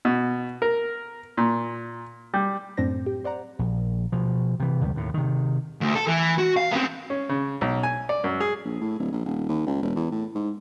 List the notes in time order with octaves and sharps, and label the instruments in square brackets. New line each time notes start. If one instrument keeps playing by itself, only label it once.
[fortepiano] B2
A#4
A#2
G3
[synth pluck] F#2 A2 C4 D4 C5 A#6
G4
C5 D5 F#5 A#5
[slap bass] A#1
B2 F3
C3 E3
F1 D2 D#3 G3
D#2 A2
C3 D#3
[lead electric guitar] D2
A4
E3
F#4
F5
B3 C4
[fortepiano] C#4
C#3
B1
G#5
D5
F#2
G#4
[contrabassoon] A#1
A2
D1
A#1
D#1
D#2
C#2
E1
E2
A2
G#2